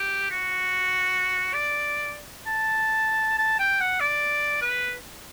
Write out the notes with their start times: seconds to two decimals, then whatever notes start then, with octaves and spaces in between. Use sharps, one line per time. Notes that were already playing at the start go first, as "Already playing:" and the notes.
Already playing: G4
0.31 F#4
1.54 D5
2.47 A5
3.38 A5
3.59 G5
3.80 F#5
4.00 D5
4.62 B4